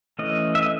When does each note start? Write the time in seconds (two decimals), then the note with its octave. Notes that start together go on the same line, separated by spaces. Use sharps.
0.19 E3 A3 C#4 D#5
0.55 E5
0.62 D#5